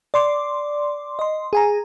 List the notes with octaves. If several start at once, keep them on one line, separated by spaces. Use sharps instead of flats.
D5 C6 D6
D#5 C6
G#4 G#5 A#5